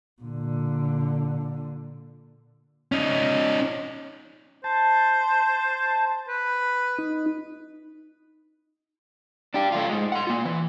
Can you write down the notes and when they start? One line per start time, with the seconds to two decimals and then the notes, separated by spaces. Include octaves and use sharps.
0.22 A#2 D3
2.92 C#4 D#4
4.64 C5 A5
6.28 B4
6.98 D#4
9.54 D4 G4
9.72 A3 F4
9.89 G#2 G#3
10.12 F#5 C6
10.27 A#3 F4
10.45 E3